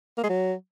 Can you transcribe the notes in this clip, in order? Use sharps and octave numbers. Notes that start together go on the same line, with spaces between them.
A#3
G#3
F#3